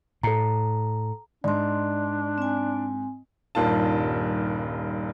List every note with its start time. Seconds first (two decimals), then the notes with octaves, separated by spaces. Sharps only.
0.23 A2 A4 A#5
1.44 G#2 D4 D5 C6
2.38 C4 G#5
3.55 D#1 G2 D#3 F4 A5